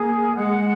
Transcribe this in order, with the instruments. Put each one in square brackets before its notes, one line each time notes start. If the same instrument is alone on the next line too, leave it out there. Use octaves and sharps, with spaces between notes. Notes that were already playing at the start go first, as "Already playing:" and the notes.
Already playing: [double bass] A#3 [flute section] G#4
[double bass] G#3 [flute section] F#5